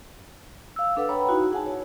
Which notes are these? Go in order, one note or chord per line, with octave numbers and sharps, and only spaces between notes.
F5 E6
D4 A4 B4 F#5
B4 C#5 F#5 G5 A#5 B5
D#4 E4 F#4
G#4 F#5 G#5 A5
C#5